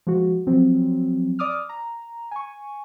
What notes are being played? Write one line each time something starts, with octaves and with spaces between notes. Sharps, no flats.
F3 G#3 F#4
F3 F#3 C4
D5 D6 D#6 F6
A#5
G#5 C#6